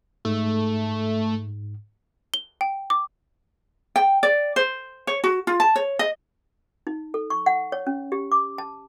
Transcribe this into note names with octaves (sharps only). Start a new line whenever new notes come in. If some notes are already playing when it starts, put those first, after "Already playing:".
G#2 A3
G7
G5
D6
G5
D5
C5
C#5
F#4
F4
A5
C#5
D#5
D#4
A4
C#6
F#5
C#5
C#4
G4
D6
A5